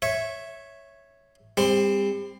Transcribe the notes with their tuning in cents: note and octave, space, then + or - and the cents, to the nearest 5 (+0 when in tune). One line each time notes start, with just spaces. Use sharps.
C#5 +0 E5 +0 C#6 -15
G3 +35 C4 +0 C6 +0